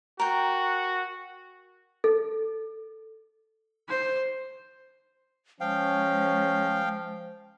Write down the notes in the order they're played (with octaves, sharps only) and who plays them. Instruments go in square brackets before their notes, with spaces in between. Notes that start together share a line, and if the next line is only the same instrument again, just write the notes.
[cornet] F#4 [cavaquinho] A#4 G5
[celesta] A4
[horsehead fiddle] C5
[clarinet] F3 [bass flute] G#3 [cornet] C#4 [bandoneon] F5 G5